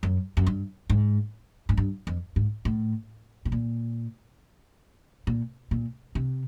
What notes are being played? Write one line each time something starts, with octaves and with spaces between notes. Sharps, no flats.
F#2
F#2
G2
G#2
G#2
G2
F2
G#2
A2
B2
A#2
A#2
A#2
C3